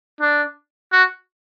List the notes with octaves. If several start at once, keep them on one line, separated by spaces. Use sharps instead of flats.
D4
F#4